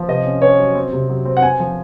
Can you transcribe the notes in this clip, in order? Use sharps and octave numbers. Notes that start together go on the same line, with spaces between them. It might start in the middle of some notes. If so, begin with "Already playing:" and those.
Already playing: F3
C3 D#5
C#4
C#4 C#5
F#3
C4
C3
F#3
C4
F#5
C4 G#5
F3